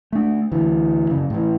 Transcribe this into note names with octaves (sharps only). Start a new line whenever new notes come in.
A3 D4
D2 E3
F#2 C#3
A2 E3